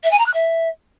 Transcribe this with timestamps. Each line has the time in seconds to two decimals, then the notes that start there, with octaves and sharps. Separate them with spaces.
0.03 E5
0.11 G#5
0.18 A#5
0.26 F#6
0.33 E5